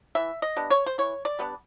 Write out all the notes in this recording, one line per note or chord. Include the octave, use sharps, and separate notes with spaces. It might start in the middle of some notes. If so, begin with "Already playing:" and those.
E3 E5
D#5
G3 B3 D4
C#5
C5
E3 C#5
D5
G3 B3 D4